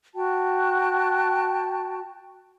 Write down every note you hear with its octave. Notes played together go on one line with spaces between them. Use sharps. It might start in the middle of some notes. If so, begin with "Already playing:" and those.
F#4 G5 A5